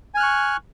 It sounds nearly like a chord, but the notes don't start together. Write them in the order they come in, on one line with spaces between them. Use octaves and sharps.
G#5 F6 F#6 C#6